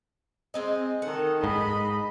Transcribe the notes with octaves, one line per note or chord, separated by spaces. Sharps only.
G#3 C4 D#5
D#3 A4 F#5
G#2 D#5 B5